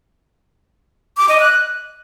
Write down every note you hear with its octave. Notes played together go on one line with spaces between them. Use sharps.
D6
D#5
F#6